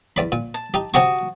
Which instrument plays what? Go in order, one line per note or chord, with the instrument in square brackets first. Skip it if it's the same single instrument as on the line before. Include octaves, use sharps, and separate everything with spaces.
[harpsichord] E2 D5 B5
A#2
[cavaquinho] A5
[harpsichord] D#4 G4
[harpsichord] C3 G4 C#6 [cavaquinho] F#4 A5 D#6